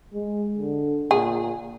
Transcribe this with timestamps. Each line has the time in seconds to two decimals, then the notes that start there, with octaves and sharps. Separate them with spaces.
0.14 G#3
0.58 D3
1.11 A#2 G#4